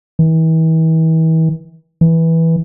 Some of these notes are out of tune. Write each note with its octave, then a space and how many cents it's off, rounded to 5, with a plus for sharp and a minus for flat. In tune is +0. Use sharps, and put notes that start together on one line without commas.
E3 -40
E3 -10